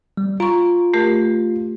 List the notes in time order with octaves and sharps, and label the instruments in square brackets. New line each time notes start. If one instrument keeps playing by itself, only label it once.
[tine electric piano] G3
[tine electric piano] F4 [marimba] A#5 C#6
[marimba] A3 G4 A#4